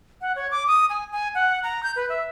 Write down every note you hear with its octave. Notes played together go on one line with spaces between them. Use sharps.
F#5
C#5
D6
D#6
G#5
G#5
F#5
A#5
G6
B4
E5